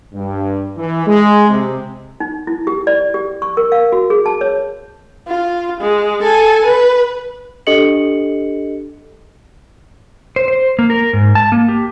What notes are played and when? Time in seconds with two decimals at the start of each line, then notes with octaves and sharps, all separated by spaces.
0.14 G2
0.78 E3
1.07 G#3
1.50 C3
2.20 D#4
2.47 E4
2.67 G4
2.87 D5
3.14 G4
3.42 C#6
3.57 A#4
3.72 F5
3.92 F#4
4.10 G#4
4.26 A5
4.41 C#5
5.27 F4
5.81 G#3
6.23 A4 G#5
6.65 B4
7.67 D4 G4 A4 D#5 C#7 F#7
10.36 C5
10.48 C5
10.79 A#3
10.90 A#4
11.13 G#2
11.35 A5
11.52 A#3
11.68 G4